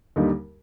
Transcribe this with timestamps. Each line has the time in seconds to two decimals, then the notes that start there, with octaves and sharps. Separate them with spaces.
0.16 D#2 D3 G3 A#3 D#4